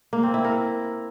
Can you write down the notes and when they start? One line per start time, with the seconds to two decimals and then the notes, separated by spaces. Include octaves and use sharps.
0.13 A#3
0.23 C4
0.34 E4
0.44 A#4